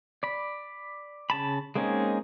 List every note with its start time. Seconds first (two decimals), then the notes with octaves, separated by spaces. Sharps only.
0.23 D5 B5
1.30 C#3 A5 B5
1.75 G#3 A#3 C4 C#4 D#4